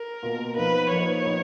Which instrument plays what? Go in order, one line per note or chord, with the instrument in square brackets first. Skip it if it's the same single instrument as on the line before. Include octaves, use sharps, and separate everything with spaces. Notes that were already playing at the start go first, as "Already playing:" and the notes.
Already playing: [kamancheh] A#4
[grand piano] B2 A#3 F4
[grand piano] F3 B3 D#4 [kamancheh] B4
[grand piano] F3 A#3 D#4 [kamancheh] C#5
[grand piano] F3 B3 D#4